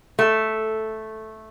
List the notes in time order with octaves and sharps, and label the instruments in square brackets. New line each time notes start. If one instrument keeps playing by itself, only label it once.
[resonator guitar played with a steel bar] A3